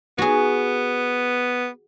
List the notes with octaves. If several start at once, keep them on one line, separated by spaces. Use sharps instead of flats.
B3 F#4 G#4